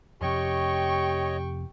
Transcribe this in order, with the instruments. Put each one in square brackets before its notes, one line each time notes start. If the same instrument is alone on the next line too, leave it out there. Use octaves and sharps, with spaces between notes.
[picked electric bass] F2 C3 [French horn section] G4 [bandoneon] C#5 D#5 [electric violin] G5 C#6